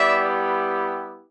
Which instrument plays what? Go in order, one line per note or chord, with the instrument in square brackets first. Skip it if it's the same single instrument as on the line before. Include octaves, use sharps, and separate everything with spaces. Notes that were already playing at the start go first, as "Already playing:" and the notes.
Already playing: [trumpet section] G3 B3 E4 G4 D5 E5